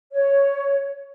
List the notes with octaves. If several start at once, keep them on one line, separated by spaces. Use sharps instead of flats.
C#5